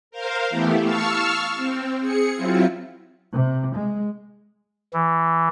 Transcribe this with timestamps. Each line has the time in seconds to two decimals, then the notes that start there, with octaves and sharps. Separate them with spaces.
0.11 A#4 C5 F5
0.50 E3 A3 B3 E4 G4
0.82 F5 A5 C#6 E6 F6
1.55 C4
2.00 G#4 C#7
2.35 F#3 C4 E4 F4
3.33 C3
3.76 G#3
4.93 E3